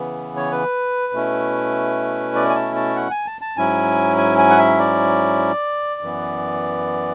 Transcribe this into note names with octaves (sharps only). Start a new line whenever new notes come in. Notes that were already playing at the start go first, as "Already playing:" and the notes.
Already playing: C#3 E3 B3
C#5
B4
B2 A3 C#4 E4
D5
G#5
A5
A5
F#5
G#5
A5
A5
G#2 F#3 C#4 E4 G#5
G#5
G#5
F#5
E5
D5
F#2 E3 B3